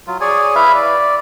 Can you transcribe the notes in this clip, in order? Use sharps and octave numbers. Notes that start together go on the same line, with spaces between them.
F#3 F4
G#4 C#5 D5 G#5
E4 B4 E5 F5
D5